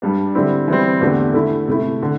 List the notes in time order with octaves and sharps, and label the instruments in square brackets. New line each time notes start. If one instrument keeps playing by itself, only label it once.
[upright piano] G2 G3 D4
D3 G3 C4 E4
E3 G3 C4
E2 D3 A3 D4 G4
D3 A3 E4
C3 A3 E4
D3